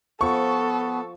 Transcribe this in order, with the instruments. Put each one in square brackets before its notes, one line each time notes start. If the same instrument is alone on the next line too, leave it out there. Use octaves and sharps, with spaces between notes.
[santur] F3 [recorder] B3 [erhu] A4 [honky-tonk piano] C#6